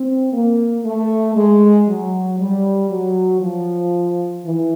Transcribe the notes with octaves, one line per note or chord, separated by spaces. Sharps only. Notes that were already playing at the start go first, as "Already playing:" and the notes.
Already playing: C4
A#3
A3
G#3
F#3
G3
F#3
F3
E3